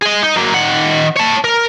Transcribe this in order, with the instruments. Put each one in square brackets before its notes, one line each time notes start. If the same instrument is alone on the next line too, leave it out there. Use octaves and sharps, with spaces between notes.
[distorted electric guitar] G#4 D#5
D#4
F#3 A#3
D#3 F#5
C#5 A5
A#4